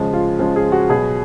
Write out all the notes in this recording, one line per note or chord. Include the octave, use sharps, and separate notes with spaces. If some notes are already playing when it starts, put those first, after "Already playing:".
Already playing: C#3 F3 G#3
F4
C#3 F3 G#3
G#4
F#4
B2 F#3 G#4